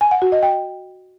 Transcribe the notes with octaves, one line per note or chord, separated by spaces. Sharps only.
G#5
F#5
F#4
D#5
G5